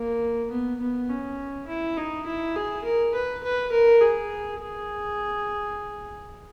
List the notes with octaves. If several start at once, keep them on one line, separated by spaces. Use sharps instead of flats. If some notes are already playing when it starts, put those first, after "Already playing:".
Already playing: A#3
B3
B3
C#4
E4
D#4
E4
G#4
A#4
B4
B4
A#4
G#4
G#4